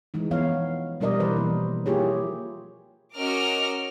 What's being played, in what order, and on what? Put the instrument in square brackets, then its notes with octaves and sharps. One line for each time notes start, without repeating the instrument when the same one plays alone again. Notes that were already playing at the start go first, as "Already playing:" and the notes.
[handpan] E3 G#3 D#4
F3 B3 C#5 F5
B2 G3 D4 A#4 D5 D#5
E3 B4 C5
B2 F3 A#3
A#3 E4 F4 G4 G#4 C#5
[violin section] C#4 F#4 A#4 D#5 D6 F6